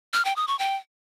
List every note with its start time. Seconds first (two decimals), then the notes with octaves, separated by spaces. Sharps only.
0.14 F6
0.25 G5
0.36 D#6
0.48 C#6
0.59 G5